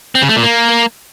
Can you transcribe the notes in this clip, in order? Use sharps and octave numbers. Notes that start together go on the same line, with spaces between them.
C4
C#3
A3
A#2
A#3